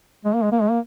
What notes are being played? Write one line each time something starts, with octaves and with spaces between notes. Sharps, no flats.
G#3
A#3
G#3
A#3
G#3
A#3